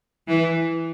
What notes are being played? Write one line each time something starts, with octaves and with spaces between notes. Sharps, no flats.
E3